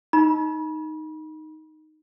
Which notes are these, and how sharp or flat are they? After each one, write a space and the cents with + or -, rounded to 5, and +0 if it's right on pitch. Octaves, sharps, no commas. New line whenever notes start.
D#4 +0 B5 -35